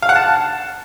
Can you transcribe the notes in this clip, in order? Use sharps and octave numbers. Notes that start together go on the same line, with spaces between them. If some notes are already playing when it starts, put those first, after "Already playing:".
F5
F#5
A5